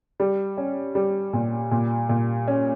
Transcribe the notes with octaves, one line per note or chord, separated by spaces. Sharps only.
G3
C#4
G3
A#2
A#2
A#2
C#4